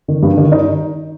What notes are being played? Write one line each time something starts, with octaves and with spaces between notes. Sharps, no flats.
D#3
G2
D#3
D#4